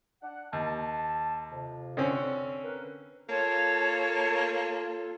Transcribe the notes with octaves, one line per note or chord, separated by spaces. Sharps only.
D4 F#5
D#2 A5
F2 C3
D3 C4 C#4
A#4 B4
A#3 F4 A4 C#5 A5